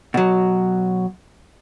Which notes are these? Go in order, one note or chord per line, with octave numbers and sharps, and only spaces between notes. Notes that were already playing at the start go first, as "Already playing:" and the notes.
B2 F#3